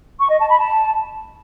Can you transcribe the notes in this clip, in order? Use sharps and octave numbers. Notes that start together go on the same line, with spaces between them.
C#6
D#5
A5
B5
A5